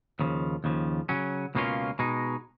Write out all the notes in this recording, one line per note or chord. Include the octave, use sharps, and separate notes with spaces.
D#2 C#3 F3
D#2 C#3 F3
C#3 F#3 C#4
C#2 B2 A#3 C#4 F4
B2 G#3 D#4